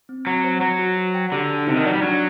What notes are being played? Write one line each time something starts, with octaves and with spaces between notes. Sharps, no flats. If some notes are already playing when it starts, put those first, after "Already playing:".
C4
F#3 C4
C5
F#3 C5
F#4
F#4
G5
D3 G4
A5
C3 D#4
D#3
F#3 D5
G3
F#3 D4